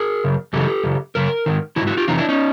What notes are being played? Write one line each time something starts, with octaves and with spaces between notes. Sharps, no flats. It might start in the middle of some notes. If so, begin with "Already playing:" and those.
Already playing: G#4 A#4
F#2 C#3
F#2 C#3 E3 G4 A4
F#2 C#3
F#2 C#3 A#4
G#2 D#3
D#3 E4 F#4
G#2
E4 F#4
F4 G4
F2 C3 E3 D#4 F4
D4 E4
C#4 D#4